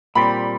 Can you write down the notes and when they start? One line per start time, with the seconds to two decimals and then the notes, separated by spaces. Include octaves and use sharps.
0.15 A#2 G3 C4 B5